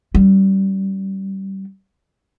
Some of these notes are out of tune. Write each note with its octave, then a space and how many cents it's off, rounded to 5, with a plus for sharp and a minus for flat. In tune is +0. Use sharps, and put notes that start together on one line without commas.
G3 -20 C#4 +20